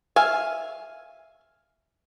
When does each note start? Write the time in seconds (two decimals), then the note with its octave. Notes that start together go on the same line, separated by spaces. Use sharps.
0.16 E5 F5 G#5